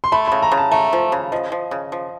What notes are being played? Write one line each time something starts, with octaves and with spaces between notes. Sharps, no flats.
C6
A3 B5
B5
C#3
A#5
C#3
A5
A3 A#5
F3
C#3
F3 D#5
F3
C#3
F3